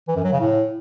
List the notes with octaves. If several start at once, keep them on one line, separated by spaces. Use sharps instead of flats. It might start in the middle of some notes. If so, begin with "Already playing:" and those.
E3
F#2
F#3
C#3
A2